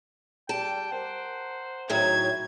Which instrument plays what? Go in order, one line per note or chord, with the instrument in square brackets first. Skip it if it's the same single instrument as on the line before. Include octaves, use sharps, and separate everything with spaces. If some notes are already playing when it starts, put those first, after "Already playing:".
[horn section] G3 G5 [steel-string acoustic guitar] A5
[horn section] A#4 C5 F#5
[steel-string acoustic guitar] A2 D#3 F#3 [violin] G#6